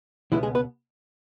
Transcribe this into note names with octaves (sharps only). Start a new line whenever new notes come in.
C#2 B2 E3 G#3 B3 E4
G#3 G#4
B3 B4